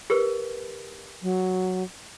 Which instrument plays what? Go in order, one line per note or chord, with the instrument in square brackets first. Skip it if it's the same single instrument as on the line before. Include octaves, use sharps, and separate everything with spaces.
[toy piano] G4 A#4 B4
[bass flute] F#3